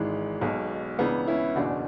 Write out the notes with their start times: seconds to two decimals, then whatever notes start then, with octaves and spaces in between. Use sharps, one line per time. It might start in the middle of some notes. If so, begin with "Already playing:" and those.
Already playing: G#1 G#2 E3 G#3
0.41 B1 B2
0.99 C#2 C#3 E3 B3 D4
1.28 C#4 E4
1.55 F#1 E2 B2 D4 F#4